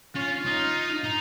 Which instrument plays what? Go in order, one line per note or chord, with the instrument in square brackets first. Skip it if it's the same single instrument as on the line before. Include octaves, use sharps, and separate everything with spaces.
[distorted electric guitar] C#4 [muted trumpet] F4
[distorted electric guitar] D#4
D#4